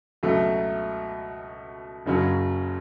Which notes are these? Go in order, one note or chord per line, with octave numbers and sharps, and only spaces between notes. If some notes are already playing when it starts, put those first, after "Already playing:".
C#2 B2 F#3 A3
F#1 F#2 C#3 F#3 C#4